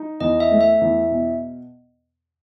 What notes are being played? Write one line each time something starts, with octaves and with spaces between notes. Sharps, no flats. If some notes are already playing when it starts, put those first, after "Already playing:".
Already playing: D#4
E2 D#5
E5
A3
E5
E2
B2